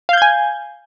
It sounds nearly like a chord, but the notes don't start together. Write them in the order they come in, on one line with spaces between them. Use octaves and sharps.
F5 G6 G#6 G#5